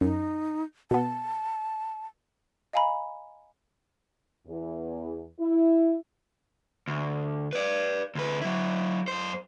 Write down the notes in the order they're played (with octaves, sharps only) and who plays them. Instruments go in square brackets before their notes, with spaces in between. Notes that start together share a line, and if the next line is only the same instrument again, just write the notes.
[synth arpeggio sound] F#2 [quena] D#4
[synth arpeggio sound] B2 B3 [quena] A5
[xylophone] D#5 F5 G#5 A#5 B5
[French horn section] E2
E4
[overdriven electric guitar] D2
B4 D5
D2 B4
F#3 E4
F#2 C5